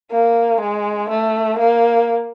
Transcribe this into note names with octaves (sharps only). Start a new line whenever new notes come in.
A#3
G#3
A3
A#3